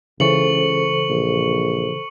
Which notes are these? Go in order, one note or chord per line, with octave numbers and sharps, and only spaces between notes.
C#2 C#3 E3 A4 C5 C#6 C#7 F#7
A#1